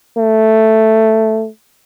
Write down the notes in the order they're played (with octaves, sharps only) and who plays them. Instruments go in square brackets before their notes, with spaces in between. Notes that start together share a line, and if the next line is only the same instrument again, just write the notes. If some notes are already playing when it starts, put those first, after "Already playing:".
[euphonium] A3